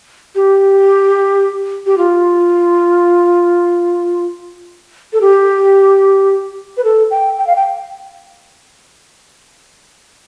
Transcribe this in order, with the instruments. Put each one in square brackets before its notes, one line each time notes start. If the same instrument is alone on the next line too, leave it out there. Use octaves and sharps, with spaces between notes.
[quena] G4
G4
F4
A4
G4
B4
A4
G5
G5
F5
G5